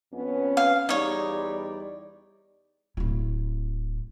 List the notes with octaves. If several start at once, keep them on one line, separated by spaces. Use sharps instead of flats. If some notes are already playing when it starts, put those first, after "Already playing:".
F2 B3 C#4
F5
E2 G3 D#4 C#5 D5
D1 E4